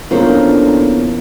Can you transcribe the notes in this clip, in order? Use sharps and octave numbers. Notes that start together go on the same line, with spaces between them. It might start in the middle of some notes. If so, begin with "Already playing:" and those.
E2 A#3 C#4 D4 F4 A4 A#4 C5